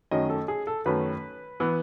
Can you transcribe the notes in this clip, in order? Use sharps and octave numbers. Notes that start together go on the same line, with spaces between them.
F#2 D#3 A3 C#4 D#5
A4
G#4
A4
F#2 D#3 A3 C#4 B4
E3 B3